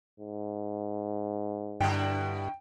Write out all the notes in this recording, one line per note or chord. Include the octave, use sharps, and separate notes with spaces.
G#2
G2 B2 D3 E4 G5